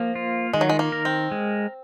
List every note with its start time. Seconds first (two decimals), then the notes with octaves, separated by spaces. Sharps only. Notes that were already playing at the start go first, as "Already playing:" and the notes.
Already playing: F3 A#3
0.15 F4
0.53 D#3 G#3
0.61 F#3
0.69 G#3
0.79 A#3
0.92 A#4
1.05 C4
1.31 G#3